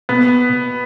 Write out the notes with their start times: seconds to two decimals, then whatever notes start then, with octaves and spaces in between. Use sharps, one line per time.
0.09 B2 B3
0.53 B2